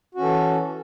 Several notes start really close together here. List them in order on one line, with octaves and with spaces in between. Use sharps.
F#4 C#4 E3 A4